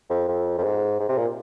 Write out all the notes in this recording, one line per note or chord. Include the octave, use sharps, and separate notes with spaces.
F2
F2
F2
G#2
G#2
C3
A#2